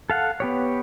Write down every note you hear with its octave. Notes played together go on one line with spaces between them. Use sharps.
A4 F5 F#5
B3 G4 C#5